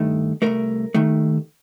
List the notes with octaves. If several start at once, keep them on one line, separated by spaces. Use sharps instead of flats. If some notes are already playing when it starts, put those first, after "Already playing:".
Already playing: G2 D#3 A3
C2 A#2 A3 A#4
D#2 D#3 A3